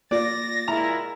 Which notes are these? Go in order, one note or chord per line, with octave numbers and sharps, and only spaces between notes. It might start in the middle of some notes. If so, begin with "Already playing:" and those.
A#3 F4 D5 A6 A#6
A#2 G#3 E4 A#5 F6